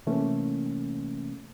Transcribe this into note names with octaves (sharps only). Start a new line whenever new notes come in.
C3 E3 A3 A#3 C#4